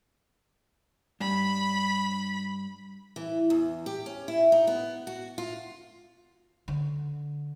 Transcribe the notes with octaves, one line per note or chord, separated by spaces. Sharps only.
G2 B5
E3
E2
G4
C#4
E4
D#4
B3
F#4
F4
D3